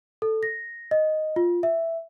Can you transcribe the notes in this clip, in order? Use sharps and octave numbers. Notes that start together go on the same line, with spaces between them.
A4
A#6
D#5
F4
E5